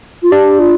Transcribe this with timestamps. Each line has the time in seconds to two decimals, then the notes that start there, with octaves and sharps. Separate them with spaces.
0.23 F4
0.31 D4 G4
0.59 F4